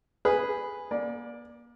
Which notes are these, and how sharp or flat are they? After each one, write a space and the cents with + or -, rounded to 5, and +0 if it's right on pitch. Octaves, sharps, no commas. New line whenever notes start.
G#4 -10 B4 +0
A#3 +35 D5 +0